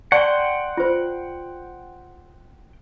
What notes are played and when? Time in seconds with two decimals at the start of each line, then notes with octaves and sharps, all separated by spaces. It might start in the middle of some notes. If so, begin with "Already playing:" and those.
0.12 D5 F#5 G5 A5 C6 C#6
0.77 F4 C5